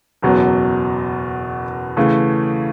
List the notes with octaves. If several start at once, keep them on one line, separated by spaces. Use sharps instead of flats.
F#1 E2 B2 F#3
C#3 E3 A3